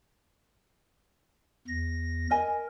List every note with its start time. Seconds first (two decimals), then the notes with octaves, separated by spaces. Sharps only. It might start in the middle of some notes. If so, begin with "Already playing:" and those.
1.68 E2 A#6
2.31 A#4 D#5 G#5